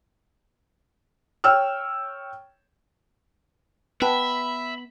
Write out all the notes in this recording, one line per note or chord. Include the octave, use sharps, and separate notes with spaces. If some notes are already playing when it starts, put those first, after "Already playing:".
C#5 G5 E6 F6
B3 B4 E5 G5 A5 B5